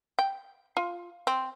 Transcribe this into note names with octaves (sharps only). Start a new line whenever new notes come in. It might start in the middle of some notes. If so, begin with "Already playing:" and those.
G5
F4
C4